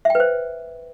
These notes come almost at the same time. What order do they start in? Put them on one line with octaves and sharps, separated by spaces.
E5 G5 B4 C5